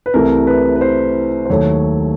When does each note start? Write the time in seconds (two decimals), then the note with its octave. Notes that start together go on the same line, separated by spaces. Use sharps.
0.06 B4
0.14 C2 C3 E3 A3 A#4
0.47 B4
0.76 B4
0.81 C5
1.46 C5
1.49 D#2 D#3 F#3 A3 C#5